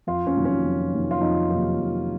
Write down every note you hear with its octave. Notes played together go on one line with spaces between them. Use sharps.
F2 F4
C#4
C3 D#3 F#3 A#3
C#4
F2
C3 D#3 F#3 A#3
F4
F2 D#4
C3 D#3 F#3 A#3
F2